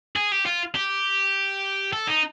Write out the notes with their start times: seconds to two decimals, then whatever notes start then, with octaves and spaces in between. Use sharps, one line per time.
0.16 G#4
0.32 G4
0.46 F4
0.75 G4
1.93 A4
2.08 D#4